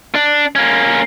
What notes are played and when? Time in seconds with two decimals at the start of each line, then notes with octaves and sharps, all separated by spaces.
0.15 D4
0.55 A#3 C#4